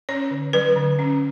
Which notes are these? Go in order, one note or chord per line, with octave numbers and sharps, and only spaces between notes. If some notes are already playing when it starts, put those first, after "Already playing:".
C#4 C#5
D3
F#3 B4
D3
C#4